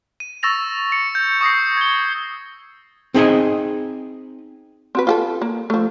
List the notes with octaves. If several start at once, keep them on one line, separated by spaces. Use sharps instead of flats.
D#7
C#6 E6 A6 A#6 F7
C#7
G6
C#6 D#6 A#6 C7
G#6 G7
C4 D#4 G#4 D#5 E5 G#5
C4 F#4 B4
F4 G4 A4
A#3
F3 A3